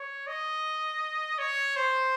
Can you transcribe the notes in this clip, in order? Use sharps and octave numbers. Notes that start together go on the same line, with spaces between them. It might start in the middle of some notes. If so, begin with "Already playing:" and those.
Already playing: C#5
D#5
C#5
C5